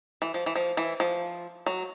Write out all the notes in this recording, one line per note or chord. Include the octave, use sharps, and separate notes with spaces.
E3
F3
E3
F3
E3
F3
F#3